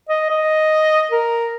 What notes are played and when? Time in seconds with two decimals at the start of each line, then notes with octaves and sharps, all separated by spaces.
0.09 D#5
0.30 D#5
1.11 A#4